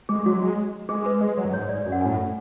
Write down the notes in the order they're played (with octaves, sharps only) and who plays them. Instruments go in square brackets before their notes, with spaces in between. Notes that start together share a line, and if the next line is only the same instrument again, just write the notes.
[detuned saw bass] G#3 [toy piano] G#4
[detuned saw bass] F#3 [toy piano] F#4
[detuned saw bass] G#3
[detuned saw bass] G#3 [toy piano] G#4
[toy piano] B4
[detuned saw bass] G#3
F#3
F#2
[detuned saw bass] G#2 [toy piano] C#5
[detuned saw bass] G#2 [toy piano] D5
[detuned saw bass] F#2
[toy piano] F#5
[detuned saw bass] A2 [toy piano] G#5